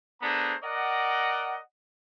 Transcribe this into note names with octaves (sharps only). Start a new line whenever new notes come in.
A3 B3 D4 G#4 C5 A#5
A#4 D5 D#5 F#5